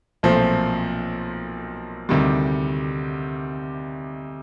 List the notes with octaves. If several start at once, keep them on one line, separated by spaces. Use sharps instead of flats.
B1 A#2 F3 A3 C4
D2 C3 D#3 G3